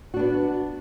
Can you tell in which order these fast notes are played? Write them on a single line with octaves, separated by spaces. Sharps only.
F#4 D4 B3